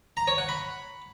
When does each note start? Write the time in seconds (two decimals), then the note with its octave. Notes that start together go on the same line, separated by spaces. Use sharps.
0.17 A#5
0.28 C#5
0.38 F#5
0.49 B5